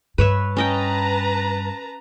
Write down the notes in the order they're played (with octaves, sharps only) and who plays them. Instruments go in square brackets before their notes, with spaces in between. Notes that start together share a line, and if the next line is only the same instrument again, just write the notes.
[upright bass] G2 [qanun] B4 C#5 E5
[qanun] C#4 D#5 G5 [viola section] B4 A5 A#5